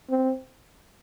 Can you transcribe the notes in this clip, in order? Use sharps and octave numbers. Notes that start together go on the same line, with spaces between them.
C4